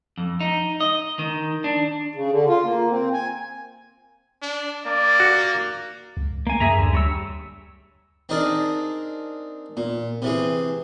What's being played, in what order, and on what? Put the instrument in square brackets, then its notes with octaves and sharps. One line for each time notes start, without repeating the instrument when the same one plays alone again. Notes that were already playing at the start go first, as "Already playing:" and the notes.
[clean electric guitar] F2
D#4
D#5
D#3
D4
[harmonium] C#3
D3
F4
A#3
C4
G#5
[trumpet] D4
[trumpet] A#3 [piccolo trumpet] D5
[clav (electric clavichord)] F#4
[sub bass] C#2
[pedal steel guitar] A#3 G#5
[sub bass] F#2 [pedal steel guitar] G#4 E5 A#5
[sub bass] D2 [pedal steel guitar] D3
[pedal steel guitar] G3 C#5 E6
[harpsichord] C4 D4 D#4 G#4 A#4 D5
A#2
C3 E3 G#4